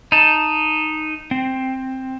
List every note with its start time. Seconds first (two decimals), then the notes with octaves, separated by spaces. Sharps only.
0.12 D#4 A5
1.31 C4